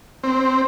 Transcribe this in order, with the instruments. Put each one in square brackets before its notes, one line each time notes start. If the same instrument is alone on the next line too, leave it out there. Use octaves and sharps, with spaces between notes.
[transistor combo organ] C4